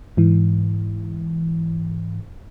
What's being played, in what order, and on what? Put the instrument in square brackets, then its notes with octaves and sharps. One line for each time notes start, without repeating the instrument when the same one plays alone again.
[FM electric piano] G#2 E3